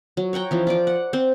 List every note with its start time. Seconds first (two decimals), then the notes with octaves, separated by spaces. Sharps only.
0.17 F#3
0.33 C#5 F#5 G5 A#5
0.51 E3 F3 C#4
0.67 F4 D5 D6
0.87 F#5
1.13 C4 C5